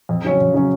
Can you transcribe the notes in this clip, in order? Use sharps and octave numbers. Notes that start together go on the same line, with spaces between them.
F2
C#3 F#3 C#4
F2
C#3 F#3 C#4